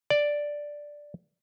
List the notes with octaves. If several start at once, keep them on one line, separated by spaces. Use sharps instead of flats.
D5